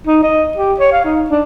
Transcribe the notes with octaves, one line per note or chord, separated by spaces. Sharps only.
D#4
D#5
G4
C#5
F5
D#4
D4